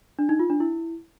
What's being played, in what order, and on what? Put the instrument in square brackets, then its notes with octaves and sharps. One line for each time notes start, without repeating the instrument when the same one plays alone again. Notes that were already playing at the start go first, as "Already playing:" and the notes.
[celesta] D4
D#4
F4
D4
E4